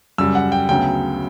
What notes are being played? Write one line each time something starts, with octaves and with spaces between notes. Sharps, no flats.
F#2 C#3 G3 E6
F#5
G5
D2 C#3 F#3 B3 G5